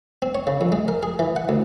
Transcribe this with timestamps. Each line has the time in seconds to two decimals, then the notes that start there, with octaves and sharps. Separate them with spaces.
0.22 C4
0.35 C#5
0.47 C#3
0.61 F2
0.72 G#3
0.88 A#4
1.03 G#4
1.19 E3
1.36 F#5
1.49 D2